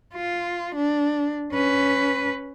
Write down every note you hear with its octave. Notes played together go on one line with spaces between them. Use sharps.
F4
D4
C#4 B4